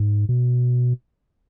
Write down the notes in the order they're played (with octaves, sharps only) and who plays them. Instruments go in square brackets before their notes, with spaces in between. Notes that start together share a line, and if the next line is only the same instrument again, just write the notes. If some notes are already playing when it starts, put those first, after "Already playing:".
Already playing: [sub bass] G#2
B2